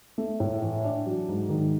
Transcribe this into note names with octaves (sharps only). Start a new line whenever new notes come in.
A3
A2
E3
D4
F#3
G#2
D#3